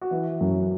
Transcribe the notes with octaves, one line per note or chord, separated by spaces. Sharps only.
F#4
E3 E4
F#2